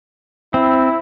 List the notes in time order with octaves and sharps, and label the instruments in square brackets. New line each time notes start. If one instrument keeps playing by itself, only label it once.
[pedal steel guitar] C4 [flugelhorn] E4